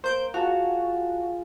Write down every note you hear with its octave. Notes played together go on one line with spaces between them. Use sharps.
A#3 C5 G6 D7
F4 F#4 G#4 F5 A5